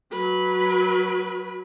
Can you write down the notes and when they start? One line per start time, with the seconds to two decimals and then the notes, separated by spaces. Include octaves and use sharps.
0.11 F#3 B4